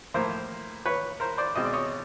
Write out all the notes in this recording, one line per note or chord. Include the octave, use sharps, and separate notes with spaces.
A2 F3 A#3 A#4 C5
B4 C#5
A#4 C5
C5 D5
B2 G#3 C4 D#5
D5
C#5 D#5